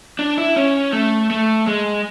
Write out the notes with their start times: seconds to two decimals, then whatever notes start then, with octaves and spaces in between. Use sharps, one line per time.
0.19 D4
0.38 E4
0.56 C#4
0.93 A3
1.30 A3
1.67 G#3